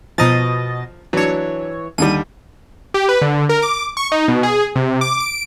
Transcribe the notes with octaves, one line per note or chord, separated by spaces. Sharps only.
B2 F3 D#5 A#5 A6
E3 F#3 D4 C#5
D#2 D3 G3 D#7
G4
B4
D3
A#4
D6
C#6
D#4
B2
G#4
C3
D6
D7